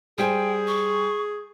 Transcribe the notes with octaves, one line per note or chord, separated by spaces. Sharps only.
G3 G#4 C5 G5 G#5
C#6